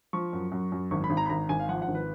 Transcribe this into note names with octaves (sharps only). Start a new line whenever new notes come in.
F3 C#6
F#2
F#2
F#2
G#1 C#6
B5
G#1
A#5
B5
G#1 A#5
G#1 G#5
F5
F3 F#5
F#5
G#1
B4